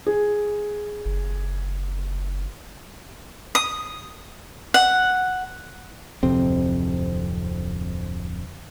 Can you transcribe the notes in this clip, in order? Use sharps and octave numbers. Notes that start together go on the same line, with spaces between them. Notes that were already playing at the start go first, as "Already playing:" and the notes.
G#4
F#1
D#6
F#5
D1 F2 C3 C4